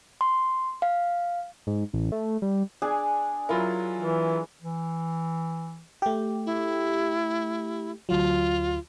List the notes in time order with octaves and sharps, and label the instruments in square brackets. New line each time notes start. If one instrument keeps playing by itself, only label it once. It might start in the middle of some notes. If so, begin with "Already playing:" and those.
[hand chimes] C6
F5
[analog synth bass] G#2
A1
A3
G3
[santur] D4 G#4 G#5
[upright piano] F#3 F4 A#4 [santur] E4
[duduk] E3
[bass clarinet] E3
[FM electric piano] A3 G4
[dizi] E4
[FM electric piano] D2 F#3 [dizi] F4